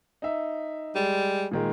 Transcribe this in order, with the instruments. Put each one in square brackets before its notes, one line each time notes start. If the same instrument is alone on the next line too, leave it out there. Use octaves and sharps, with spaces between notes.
[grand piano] D#4 E5
[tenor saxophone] G3 [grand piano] G#3
[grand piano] A#2 D#3 G#3